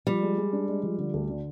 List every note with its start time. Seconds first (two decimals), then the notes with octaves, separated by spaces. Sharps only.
0.07 F3 G3
0.23 G#3
0.37 G#3
0.52 D4
0.68 G#3
0.83 F3
0.98 D3
1.13 D2
1.29 D3